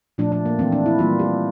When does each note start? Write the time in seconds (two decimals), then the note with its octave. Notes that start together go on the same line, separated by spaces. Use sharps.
0.18 A#2 F3 A3 D4
0.32 D4
0.46 A#3
0.59 E3 A3 C4
0.72 D4
0.86 E4
0.99 E3 G3 A#3 F4
1.19 G4